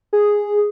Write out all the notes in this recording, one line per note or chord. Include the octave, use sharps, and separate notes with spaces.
G#4